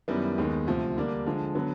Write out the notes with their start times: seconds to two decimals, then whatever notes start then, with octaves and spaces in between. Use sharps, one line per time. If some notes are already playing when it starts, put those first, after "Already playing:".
0.08 F#2 D#3 G3 B3 E4
0.38 D#2 D#3 G#3 B3
0.67 D2 C3 F3
0.96 D3 G3 A#3 D4
1.26 D3 F3 G#3
1.55 D3 F#3 B3